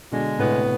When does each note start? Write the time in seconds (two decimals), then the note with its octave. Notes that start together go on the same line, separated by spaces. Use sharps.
0.12 B2 D3 G#3
0.38 A2 C3 B3